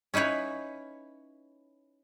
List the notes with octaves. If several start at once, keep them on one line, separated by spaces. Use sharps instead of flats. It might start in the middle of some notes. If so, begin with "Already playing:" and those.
C#4 D#4 E4 B4 C#5